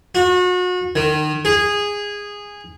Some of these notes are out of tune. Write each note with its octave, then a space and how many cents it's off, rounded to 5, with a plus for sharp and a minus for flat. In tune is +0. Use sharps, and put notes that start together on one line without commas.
F#4 -35
D#3 -30
G#4 -15